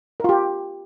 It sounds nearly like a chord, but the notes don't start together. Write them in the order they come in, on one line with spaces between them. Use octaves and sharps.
A#4 F4 G4